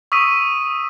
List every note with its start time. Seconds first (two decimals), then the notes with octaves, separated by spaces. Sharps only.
0.12 C#6 D#6 E6 B6 D#7